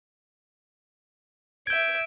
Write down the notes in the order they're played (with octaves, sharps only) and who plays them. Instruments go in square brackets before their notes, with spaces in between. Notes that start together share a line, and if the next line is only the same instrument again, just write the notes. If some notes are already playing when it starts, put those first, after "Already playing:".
[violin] E5 D7 [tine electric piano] G6 G#6